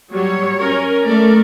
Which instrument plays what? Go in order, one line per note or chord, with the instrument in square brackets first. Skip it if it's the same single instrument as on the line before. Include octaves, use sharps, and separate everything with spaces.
[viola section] F#3 G3 [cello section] C#5
[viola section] C#4 A#4
[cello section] A3 [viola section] A4 A#4 D5